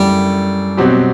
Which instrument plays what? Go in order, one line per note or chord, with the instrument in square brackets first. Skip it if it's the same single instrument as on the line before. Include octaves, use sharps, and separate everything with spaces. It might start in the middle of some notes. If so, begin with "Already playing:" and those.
Already playing: [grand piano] F#2 D3 A3 E4 [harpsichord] G3
[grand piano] B2 F#3 C4 G4